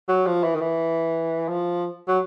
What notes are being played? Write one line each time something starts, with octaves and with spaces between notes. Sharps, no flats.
F#3
F3
E3
D#3
E3
F3
F#3